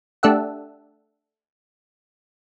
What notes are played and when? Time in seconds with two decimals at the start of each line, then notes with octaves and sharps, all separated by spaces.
0.23 A3 D4 G4 A4 E5 F#5